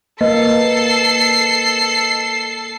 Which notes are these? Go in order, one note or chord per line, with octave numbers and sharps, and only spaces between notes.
A#3 A4 B4 D#5 C7